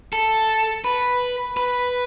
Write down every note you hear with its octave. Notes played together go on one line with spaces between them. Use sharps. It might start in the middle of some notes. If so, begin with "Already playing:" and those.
A4
B4
B4